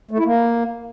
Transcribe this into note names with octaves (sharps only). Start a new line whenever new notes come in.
A3
E4
A#3